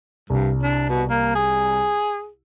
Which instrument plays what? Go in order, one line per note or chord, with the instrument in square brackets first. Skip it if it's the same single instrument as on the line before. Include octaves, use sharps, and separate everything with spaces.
[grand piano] C2 [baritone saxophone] G2
[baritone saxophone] D4
B2
A#3
G#4